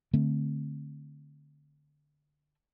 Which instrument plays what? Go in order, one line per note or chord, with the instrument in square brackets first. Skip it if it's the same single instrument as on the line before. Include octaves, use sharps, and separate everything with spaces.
[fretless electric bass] D3 A3 C4